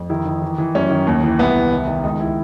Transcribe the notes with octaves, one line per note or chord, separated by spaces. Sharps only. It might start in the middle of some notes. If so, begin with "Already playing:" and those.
Already playing: F2
D#3 E4
D#3
E3
E3
F#2 C#4
D#3
D#2
E3
C2 B3
C2
D#3
D#3
C#2 D#4
E4